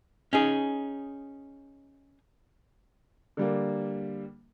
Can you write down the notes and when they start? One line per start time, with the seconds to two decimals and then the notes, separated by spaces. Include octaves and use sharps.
0.33 C#4 D#4 G#4
3.37 D3 G3 A#3